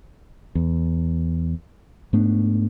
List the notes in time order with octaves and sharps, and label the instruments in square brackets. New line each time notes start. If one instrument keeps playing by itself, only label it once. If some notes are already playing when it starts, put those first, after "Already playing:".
[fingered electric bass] E2
G#2 A3 B3 D4